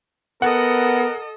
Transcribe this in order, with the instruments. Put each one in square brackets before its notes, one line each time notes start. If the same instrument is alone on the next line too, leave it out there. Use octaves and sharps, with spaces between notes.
[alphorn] B3 [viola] A4 D#5 [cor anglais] A#4 [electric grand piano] F#5